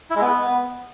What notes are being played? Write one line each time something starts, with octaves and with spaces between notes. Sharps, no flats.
E4
G#3
B3